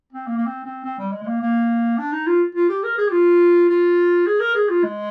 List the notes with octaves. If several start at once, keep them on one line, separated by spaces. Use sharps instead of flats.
C4
A#3
A#3
C4
C4
C4
G3
G#3
G#3
A#3
A#3
D4
D#4
F4
F4
G4
A#4
G#4
G4
F4
F4
G#4
A#4
G#4
F4
G#3